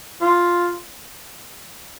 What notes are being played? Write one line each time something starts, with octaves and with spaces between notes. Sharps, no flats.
F4